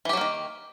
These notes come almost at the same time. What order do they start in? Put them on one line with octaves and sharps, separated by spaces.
E3 G4 F#3 A#3 D#3